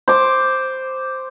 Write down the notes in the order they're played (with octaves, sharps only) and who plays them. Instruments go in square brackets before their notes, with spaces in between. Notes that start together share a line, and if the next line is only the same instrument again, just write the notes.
[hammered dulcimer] C5 D6